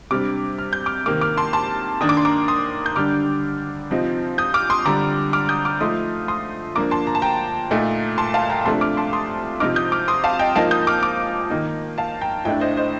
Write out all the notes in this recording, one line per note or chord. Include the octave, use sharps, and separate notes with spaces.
C3 G3 D4 D6 F6
F6
G6
D6 F6
C3 D#3 A#3 D6 F6
D6 F6
A5 C6
A5 C6
D#3 A#3 D4 D#6
D6
C6
A#5 D6
C6 D#6
G6
D3 G3 D4 D6 F6
C3 F3 C4 D#4
D#6 G6
D6 F6
C6 D#6
D3 G3 D4 A#5 D6
D6 F6
D#6 G6
D6 F6
F3 A3 D#4 C6 D#6
C6 D#6
F3 A#3 D4 A#5 D6
A5 C6
A#5
A5
G5 A#5
A#2 A3 D#4
A5 C6
F5 A5
G5 A#5
C3 F3 A3 D4 A5 C6
D6 F6
A5 C6
C6 D#6
C3 F3 C4 D#4 D6 F6
D#6 G6
D6 F6
C6 D#6
F5 A5
D#5 G5
F3 A#3 D#4 F5 A5
D#6 G6
D6 F6
D6 F6
D#3 A#3 D#4
F5 A5
G5 A#5
A2 A3 D4 D#5 G5
C5 D#5
C5 D#5